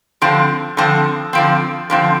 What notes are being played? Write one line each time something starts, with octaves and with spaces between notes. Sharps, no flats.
D3 F3 C4
D3 F3 C4
D3 F3 C4
D3 F3 C4